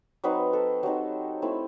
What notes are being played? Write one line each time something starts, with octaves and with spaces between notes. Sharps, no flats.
F#3 C4 D#4 B4
A4
F#3 C4 D#4 G4
A3 C4 E4